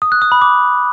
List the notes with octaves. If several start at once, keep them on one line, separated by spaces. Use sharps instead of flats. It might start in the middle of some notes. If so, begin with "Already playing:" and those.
D#6
F#6
D#6
B5
D6